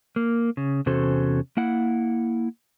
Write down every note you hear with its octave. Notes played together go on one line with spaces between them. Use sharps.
A#3
C#3
E2 C3 C#4 F#4 A4 C5
A#3 E4 F#5